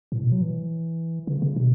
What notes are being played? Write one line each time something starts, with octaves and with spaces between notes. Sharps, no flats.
A2
B2
F#3
E3
C#3
C#3
B2